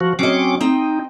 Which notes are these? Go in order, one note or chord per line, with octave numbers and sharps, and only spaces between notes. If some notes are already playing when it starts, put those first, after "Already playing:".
F3 F#4
F#3 C4 C#4 D#5 D6
C4 D#4 G5